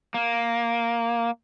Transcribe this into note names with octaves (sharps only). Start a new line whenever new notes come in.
A#3